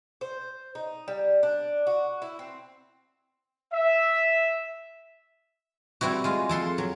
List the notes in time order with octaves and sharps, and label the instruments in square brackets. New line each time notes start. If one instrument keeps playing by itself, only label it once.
[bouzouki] C5
D#4
G3
D4
F#4
E4
C4
[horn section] E5
[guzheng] G3 C4 E4 F#4
G#3 F4
F2 A4 C6
F#3